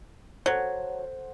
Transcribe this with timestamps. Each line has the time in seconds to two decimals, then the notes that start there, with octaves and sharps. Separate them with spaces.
0.46 F#3 A4 C5 F#5